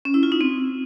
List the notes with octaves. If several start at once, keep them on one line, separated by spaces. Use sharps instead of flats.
C#4
E4
F4
D#4
C4